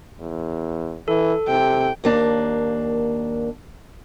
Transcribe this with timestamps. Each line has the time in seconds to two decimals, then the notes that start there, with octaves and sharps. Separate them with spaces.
0.20 E2
1.08 E3 A4
1.48 C3 G5
2.04 D#2 A#3 D4